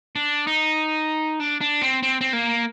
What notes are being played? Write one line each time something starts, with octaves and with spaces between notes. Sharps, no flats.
D4
D#4
D4
D4
C4
C4
C4
A#3